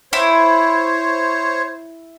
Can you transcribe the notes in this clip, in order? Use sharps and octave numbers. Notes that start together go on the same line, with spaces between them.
E4 C5 C#5